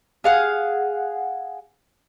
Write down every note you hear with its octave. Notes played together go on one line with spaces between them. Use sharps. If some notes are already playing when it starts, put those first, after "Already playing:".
G#4 F5 F#5